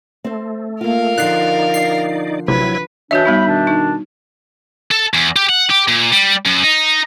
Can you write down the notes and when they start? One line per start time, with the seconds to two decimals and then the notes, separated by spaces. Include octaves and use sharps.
0.24 A3 C4 C5
0.81 A#3 F4 A#4 F5
1.18 D3 F3 D#4 D5 F#6 C7
1.74 C7
2.48 A1 C3 F#3 E4 B4 G#6
3.11 E3 D4 F#4 C#5 D#5 E5 G6
3.25 G3 B3 D#4 B5
3.46 B2 D#3 D4
3.67 D#4
4.91 A4
5.14 E2
5.36 G4
5.49 F#5
5.70 G4
5.88 A#2
6.12 G3
6.46 F#2
6.64 D#4